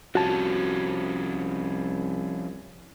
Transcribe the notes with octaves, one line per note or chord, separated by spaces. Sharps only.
C2 F3 C#4 F#4 A5